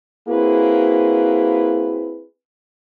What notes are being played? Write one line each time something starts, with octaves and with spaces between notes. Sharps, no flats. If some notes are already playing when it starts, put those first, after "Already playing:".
A#3 C4 E4 F#4 G#4 B4